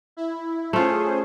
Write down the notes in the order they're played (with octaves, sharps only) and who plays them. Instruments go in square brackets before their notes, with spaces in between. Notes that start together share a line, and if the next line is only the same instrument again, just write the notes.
[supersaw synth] E4
[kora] A3 F4 [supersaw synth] C#4 G#4 C5